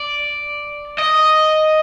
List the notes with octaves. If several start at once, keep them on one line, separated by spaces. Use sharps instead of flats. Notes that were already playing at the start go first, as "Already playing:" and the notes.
Already playing: D5
D#5